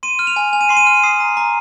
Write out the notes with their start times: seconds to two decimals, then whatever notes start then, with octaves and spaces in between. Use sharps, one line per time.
0.03 C6 D#7
0.19 F6
0.27 F7
0.36 G#5
0.53 G#5 F7
0.61 D#7
0.69 C6 C7
0.77 D#7
0.87 F6
1.03 D#6 C7
1.20 A#5
1.37 A#5